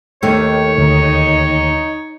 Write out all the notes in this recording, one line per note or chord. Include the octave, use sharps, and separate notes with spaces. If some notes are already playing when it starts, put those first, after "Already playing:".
D#2 D#3 A3 D#4 C#5
D2 D#4